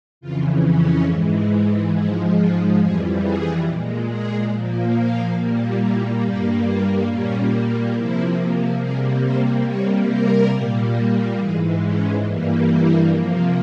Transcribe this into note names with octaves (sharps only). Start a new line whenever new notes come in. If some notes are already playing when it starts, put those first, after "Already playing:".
F2 C#3 E3 F4
C#4
G#2 E3 G#3
G#2 F3 G#3 E4
F4
F2 E3 G3 G#4
G#4
A#2 G#3
G#4
A#2 F3 A#3
F4
A#2 G3 A#3
E4
G2 G3 A#3 G4
F4
A#2 G3 A#3 C#4
C3 F3 A#3 E4
C3 G3 A#3 G#4
C5
C3 G3 A#3 C#5
A#4
A#2 G3 A#3
G#2 E3 G#3 G#4
C#4
G2 E3 G3 A#3
E4
C3 F3 A#3